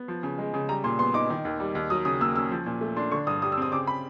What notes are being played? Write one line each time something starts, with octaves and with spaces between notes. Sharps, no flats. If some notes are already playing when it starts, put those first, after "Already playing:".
Already playing: B3
F3
C#3
G#3
C#3
G3 A#5
A#2 C6
B3 C6
D#4 D6
D#3
D#2
G3
D#2
F#3 D#6
C#3 D#6
A#3 E6
C#4 E6
F3
A#2
A3
D4 C6
D3 C#6
G2 D#6
G3 D#6
E6
C4 D#6
C#3 D6
B5